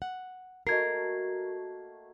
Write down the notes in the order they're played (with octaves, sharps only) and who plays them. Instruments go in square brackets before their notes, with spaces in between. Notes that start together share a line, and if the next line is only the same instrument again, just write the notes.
[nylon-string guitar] F#5
[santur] A3 A#3 F#4 [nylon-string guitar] A#4 [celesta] D#5 G#6 C7